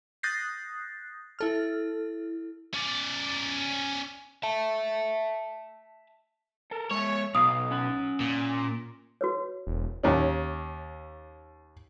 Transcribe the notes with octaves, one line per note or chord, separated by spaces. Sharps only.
D#6 F#6 G6 A6 A#6 C7
E4 A4 F6
C#4 D5
E5 A5
A4 A#4
G#3 C#5 E5
B1 F5 D#6
C#4 F#5
A#2
F#4 B4 C#5
E1
D#2 C#4